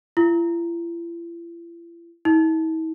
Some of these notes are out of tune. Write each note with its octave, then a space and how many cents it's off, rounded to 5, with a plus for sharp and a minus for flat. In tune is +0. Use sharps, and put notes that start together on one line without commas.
E4 +45
E4 -45